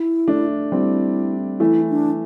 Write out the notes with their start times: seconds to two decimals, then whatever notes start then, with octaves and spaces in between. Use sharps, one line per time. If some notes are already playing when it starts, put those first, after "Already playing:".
Already playing: E4
0.28 A3 D4
0.72 G3 C4 E4
1.60 E3 A3 E4
1.90 D4